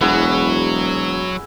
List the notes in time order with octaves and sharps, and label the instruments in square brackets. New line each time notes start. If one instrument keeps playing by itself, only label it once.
[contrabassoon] E1 [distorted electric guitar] F#3 [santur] B3 E4 G#4